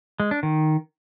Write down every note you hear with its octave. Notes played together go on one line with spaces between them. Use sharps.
G#3
D4
D#3